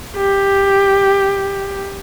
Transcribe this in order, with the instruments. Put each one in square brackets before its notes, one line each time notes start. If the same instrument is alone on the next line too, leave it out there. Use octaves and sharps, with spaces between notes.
[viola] G4